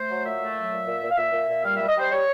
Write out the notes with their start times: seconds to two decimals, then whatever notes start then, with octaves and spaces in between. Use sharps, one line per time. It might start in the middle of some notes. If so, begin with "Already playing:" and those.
Already playing: A3 C5
0.09 F#3
0.25 A#2 E5
0.41 A3
0.56 F#3
0.71 A#2
0.87 A#2
1.02 A#2
1.10 F5
1.18 A#2 E5
1.33 A#2
1.49 A#2
1.64 G3 F5
1.77 G3 E5
1.88 D#5
1.96 G3 C5
2.11 G3 C#5